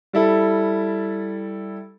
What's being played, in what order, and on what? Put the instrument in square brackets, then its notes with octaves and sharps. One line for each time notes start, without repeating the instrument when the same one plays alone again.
[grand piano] G3 E4 A4